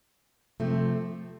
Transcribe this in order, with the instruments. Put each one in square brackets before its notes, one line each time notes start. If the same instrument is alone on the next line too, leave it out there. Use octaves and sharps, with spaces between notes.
[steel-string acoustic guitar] C3 F3 A3 C4